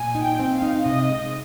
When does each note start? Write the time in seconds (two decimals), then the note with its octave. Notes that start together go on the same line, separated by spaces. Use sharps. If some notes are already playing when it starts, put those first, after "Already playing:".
Already playing: A#2 G#5
0.15 D#4
0.23 G5
0.39 C4
0.54 F5
0.62 D#4
0.86 C3 D#5
1.09 G#3